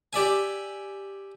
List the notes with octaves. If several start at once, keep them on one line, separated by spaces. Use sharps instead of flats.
G4 D5 E5 G#5